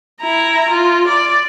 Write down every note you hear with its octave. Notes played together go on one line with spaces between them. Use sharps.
E4 A#5
F4
D5